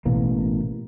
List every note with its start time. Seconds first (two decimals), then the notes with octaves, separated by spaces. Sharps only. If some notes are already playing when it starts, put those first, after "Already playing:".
0.06 A1 B2 E3 A#3